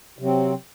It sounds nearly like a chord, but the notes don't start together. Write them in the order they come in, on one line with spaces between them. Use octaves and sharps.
C3 F#3 C4